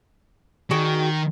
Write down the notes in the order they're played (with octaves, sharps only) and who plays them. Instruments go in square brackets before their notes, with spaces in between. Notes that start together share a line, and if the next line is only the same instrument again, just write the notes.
[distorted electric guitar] D#3 [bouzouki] F#4 G#4 G5